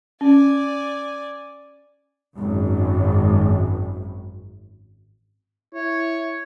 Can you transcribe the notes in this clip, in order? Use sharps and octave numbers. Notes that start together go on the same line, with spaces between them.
C#4 D5 G#5
G#1 F#2
E4 C#5